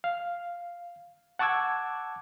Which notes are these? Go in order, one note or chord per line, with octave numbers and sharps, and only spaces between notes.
F5
F#5 A5 C#6 D6 E6 G#6